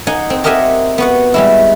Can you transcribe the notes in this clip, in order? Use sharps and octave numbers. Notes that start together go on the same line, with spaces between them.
D#4 F#5 G#5
C4
G4 A#4 D#5 E5 F#5 G#5
B3 F#4 F#5
G3 G#3 E4